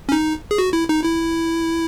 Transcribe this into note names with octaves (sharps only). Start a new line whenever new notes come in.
C#4
D#4
G#4
F#4
E4
D#4
E4